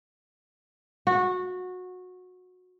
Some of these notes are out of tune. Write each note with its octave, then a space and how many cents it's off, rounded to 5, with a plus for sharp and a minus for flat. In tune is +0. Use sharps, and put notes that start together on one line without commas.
F#4 -20